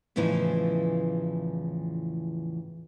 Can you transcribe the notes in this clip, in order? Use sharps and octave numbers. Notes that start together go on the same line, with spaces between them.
E2 A2 C#3 E3 F3 D#4